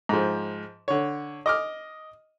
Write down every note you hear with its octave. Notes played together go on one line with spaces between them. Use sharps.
G#2 F3
D3 C#5
D#5 D6 F6